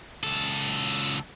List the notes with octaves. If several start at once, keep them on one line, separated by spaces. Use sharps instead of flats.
C#2 A4